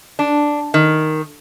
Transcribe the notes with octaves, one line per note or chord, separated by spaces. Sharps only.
D4
D#3